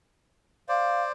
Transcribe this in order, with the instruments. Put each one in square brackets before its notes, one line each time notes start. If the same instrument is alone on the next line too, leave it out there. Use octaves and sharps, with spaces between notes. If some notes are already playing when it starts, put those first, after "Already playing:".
[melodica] C5 D5 [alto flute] F5